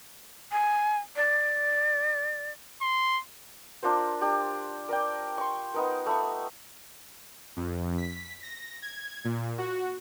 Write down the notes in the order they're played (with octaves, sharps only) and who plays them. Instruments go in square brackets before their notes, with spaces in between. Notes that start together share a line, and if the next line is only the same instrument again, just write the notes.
[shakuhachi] G#5
D5
[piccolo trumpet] C6
[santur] D4 F4 A#4 C5
D4 G4
A#4 D5 G5
C6 C#6
B3 D#4 A#4
A3 B5 C#6
[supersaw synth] F2
B6
A#6
G#6
A#2
F#4